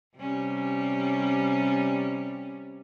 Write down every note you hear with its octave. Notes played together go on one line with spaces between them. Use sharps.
C3 G3 C#4